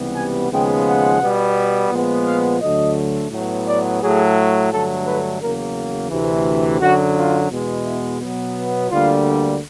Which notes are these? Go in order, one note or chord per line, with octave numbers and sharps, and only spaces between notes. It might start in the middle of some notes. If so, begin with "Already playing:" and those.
Already playing: C#2 C3 E3 G3 B3
G#5
D#2 C#3 F3 G#3 B3 G5
F#5
B2 G3 B3
A#2 F3 G#3 B3
F5
D2 D3 F#3 A3 D#5
A2 F#3 B3
D5
A2 F#3 A3 G#4
G2 D3 F#3 A3 A4
B4
E2 C#3 F#3 A#3 A#4
D2 C3 E3
F#2 D3 F#3 F#4
F4
E2 B2 G#3 B3
E4
B2 F#3 B3
D2 D3 G3 A#3 F4